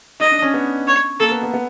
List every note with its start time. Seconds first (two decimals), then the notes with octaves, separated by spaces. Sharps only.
0.20 D#4 D#5
0.31 D4
0.42 C#4
0.54 B3
0.87 C#5
1.20 A#3 A4
1.31 B3
1.43 B3
1.54 B3